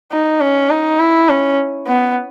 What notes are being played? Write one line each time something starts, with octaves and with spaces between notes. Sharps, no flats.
D#4
C#4
D#4
E4
C#4
B3